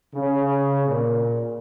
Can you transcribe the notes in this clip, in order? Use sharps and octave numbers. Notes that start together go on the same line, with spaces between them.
C#3
A#2